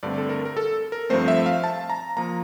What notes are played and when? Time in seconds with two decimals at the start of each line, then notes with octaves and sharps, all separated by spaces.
0.03 G2 D3 A3 C4 D5
0.18 A4
0.29 A#4
0.45 A#4
0.57 A4
0.92 A#4
1.10 G2 F3 A3 C4 C5
1.28 E5
1.46 F5
1.64 A5
1.90 A#5
2.17 F3 A#3 A#5